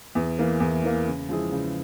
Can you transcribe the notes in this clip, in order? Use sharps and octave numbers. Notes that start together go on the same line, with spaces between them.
E2
E3 A#3
E2
E3 A#3
C#3
F3 G#3 E4 G#4
C#3